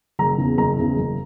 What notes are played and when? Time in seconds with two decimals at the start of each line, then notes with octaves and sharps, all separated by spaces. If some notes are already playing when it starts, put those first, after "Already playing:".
0.19 F#1 A#5
0.38 E2 C#3
0.57 F#1 A#5
0.77 E2 C#3
0.97 F#1